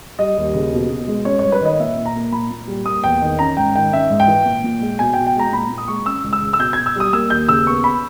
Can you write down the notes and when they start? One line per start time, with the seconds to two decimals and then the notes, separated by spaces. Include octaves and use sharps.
0.19 G3 D#5
0.37 D#2
0.54 C#3
0.73 B2
0.90 B2
1.08 G#3
1.25 C#4 C#5
1.39 G2 C#5
1.52 B4
1.61 D#3 D#5
1.80 A#2 E5
1.97 A#2
2.06 A#5
2.15 A#3
2.32 A#2 B5
2.51 A#2
2.68 G3
2.86 A#3 D#6
3.04 E2 G5
3.22 D#3
3.39 C#4 A#5
3.57 G#2 G5
3.75 D#3 G5
3.93 C#4 E5
4.10 G#2
4.20 G5
4.28 E3
4.46 A#2
4.64 A#2
4.81 G#3
4.99 B2 G#5
5.13 G5
5.18 B2
5.27 G5
5.36 G#3 A#5
5.52 A#2 B5
5.70 A#2
5.78 D#6
5.88 G#3 C#6
6.06 C#4 E6
6.24 C#2
6.33 E6
6.42 C#3
6.53 E6
6.59 B2 G6
6.73 B2 G#6
6.86 E6
6.96 G3 D#6
7.13 A#3 E6
7.30 D#2 G6
7.48 C#3 E6
7.66 B3 C#6
7.84 B5